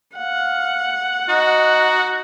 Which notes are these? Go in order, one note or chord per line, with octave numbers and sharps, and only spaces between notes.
F5 F#5
D#4 F#4 D#5